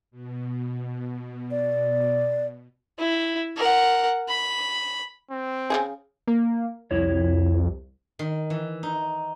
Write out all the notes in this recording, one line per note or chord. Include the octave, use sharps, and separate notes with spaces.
B2
D5
E4
A#4 F#5
B5
C4
C#3 F#3 G#4
A#3
C2 F2 E4 C#5
D#3
E3
D#4